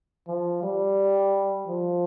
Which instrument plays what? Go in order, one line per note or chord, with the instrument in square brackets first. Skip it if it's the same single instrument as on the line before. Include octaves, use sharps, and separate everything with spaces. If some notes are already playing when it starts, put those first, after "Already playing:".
[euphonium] F3
G3
F3